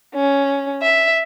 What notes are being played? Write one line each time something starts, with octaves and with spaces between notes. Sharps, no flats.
C#4
E5